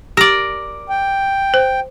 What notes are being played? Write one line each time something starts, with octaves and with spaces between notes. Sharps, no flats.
G4 A#4 D5
G5
C5